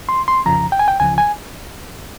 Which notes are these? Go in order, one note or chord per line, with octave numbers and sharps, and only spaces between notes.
C6
C6
F2 C#3 F3 A#5
G5
G#5
G5
C#2 C#3 F3 G#5
G#5